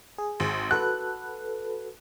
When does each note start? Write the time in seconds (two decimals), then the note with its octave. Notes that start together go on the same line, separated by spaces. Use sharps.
0.18 G#4
0.40 G#1
0.71 F#4 A4 B4 F#6